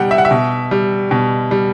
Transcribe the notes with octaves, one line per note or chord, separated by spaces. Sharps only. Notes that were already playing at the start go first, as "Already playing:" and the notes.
Already playing: B2 G3 F#5 G5
E5
F#5
E5
B2
G3
B2
G3